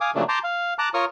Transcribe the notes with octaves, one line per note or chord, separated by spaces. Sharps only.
F5 G#5 D6 D#6
C#3 F3 F#3 A3 A#3 D4
A5 A#5 C6 D6 G6
F5
A5 A#5 D6 F#6
F4 A#4 C#5 C#6 D#6 F6